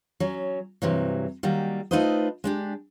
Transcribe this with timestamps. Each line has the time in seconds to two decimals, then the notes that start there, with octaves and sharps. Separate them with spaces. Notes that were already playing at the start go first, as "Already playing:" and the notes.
0.20 F#3 C#4
0.82 G2 C3 E3 F#3
1.43 D#3 F#3 G3 A#3
1.91 A3 D#4 F4 B4 C5 D#5
2.44 G#3 D4 G4